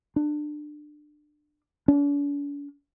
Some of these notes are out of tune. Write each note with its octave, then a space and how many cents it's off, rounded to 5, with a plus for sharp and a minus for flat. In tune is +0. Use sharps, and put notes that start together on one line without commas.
D4 +25
D4 -45